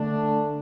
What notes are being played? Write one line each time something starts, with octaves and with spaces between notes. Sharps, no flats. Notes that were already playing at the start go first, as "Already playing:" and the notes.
Already playing: D3 A3 D4